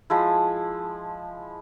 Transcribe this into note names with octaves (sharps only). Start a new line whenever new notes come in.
F3 G#3 E4